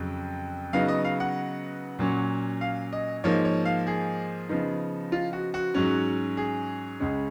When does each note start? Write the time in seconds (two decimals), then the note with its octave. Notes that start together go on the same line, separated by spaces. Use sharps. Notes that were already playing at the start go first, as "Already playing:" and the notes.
Already playing: F2 C#3 F#3
0.73 C#3 F#3 B3 D#4 F5
0.88 D#5
1.04 F5
1.20 F#5
1.99 A#2 F#3 C#4
2.61 F5
2.93 D#5
3.24 G#2 F3 A#3 D#4 C#5
3.45 C#5
3.65 F5
3.87 G#4
4.49 C#3 F3 B3 D#4
5.12 F4
5.33 F#4
5.54 F#4
5.74 G#2 F#3 C#4
6.37 G#4
7.00 C#2 C#3 G#3 C#4